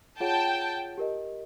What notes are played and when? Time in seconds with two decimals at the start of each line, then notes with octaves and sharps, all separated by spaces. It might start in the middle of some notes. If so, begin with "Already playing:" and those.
0.20 F4 G#4 C#5 F#5 G5 A5
0.98 G4 A#4 D#5